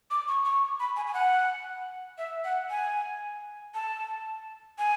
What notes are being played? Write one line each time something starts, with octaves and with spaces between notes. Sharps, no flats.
D6
C#6
C#6
B5
G#5
G#5
F#5
E5
F#5
G#5
A5
G#5